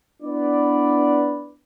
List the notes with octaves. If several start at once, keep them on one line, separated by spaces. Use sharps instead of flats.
B3 D4 E4 B4 D5